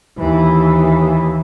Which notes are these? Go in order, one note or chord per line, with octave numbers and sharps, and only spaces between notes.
D#2 E3